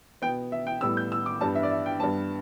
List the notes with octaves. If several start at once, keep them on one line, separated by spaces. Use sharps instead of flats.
B2 B3 G5
E5
G5
A2 G3 B3 E6
G6
E6
D6
G2 G3 B3 A5
E5
D5
E5
G5
G2 G3 B3 A5